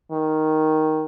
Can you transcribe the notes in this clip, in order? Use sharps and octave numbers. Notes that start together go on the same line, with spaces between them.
D#3